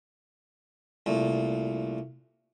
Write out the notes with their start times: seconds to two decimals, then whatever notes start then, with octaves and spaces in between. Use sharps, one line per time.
1.06 C2 A#2 A3